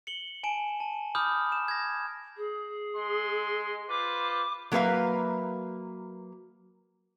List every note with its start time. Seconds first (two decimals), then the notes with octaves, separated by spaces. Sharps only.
0.07 C#7 F#7 G7
0.43 G#5 A5 D7 E7
0.80 A5
1.15 B5 D6 D#6 F6 G6
1.52 E7
1.68 G#6 A#6
2.37 G#4
2.97 G#3 C6
3.89 F4 B4 C5 D6
4.72 F#3 A#3 A4 B4 E5 F5